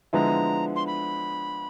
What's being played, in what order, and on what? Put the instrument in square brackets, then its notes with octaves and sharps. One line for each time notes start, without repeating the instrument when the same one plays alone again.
[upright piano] D3 F3 G#3 B3 E4 [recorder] A#5
[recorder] C6
B5